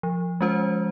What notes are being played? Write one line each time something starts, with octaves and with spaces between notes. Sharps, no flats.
F3
G#3 C#4 F4 C5